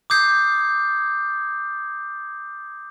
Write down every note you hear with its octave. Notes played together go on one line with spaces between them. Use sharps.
D6 D#6 G6 C7